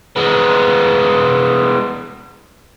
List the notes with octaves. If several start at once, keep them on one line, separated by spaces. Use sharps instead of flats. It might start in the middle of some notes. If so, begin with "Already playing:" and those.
G#3 B3